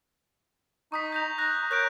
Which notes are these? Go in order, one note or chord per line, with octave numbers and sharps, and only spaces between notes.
D#4 C#6 D#6 B6
G6 A#6 F7
A#5 F#6 A#6
A#4 C#5 F#6 G6 D7